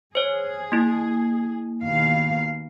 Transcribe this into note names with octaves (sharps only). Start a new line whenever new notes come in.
G#4 C5 C#5
A#3 E4
D#2 B2 F5